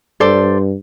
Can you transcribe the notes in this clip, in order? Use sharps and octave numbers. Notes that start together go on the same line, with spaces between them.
G2 A4 C5 D5